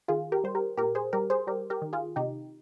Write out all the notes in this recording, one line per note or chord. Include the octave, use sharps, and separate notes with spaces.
D#3 F4 G#4
G4 A#4
G3 C5
G4 A#4
A#2 G4 A#4
G#4 C5
G3 G4 A#4
G#4 C5
G3 G4 A#4
G4 A#4
D#3
F4 G#4
C3 D#4 G4